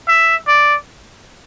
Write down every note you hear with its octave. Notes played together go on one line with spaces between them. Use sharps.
E5
D5